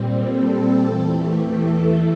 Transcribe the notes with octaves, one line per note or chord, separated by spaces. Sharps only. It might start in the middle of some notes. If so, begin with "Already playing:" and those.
Already playing: A#2 G3 C4
A4
E2 E3 A3
G4
A4